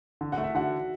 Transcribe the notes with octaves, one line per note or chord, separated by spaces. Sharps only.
D3
F#5
A3
E5
D3 F#4 F#5